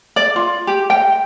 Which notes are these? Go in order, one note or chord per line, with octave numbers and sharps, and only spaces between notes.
D5
F4
G4
G5